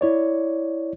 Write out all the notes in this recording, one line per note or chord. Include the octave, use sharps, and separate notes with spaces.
E4 C#5 D5